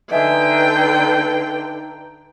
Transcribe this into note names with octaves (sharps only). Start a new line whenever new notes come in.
D3 D#4 B4 D#5 E5 G5 G#5